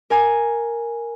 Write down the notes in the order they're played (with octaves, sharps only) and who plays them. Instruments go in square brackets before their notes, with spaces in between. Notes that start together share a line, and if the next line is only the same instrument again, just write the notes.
[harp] A#4 G#5